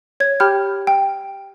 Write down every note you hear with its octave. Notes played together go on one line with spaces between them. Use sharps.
C#5 G#6
G4 G5 B5 F6 G6
G5